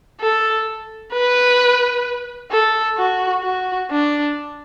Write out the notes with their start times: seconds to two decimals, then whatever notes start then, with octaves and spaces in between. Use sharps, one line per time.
0.21 A4
1.13 B4
2.51 A4
2.97 F#4
3.43 F#4
3.90 D4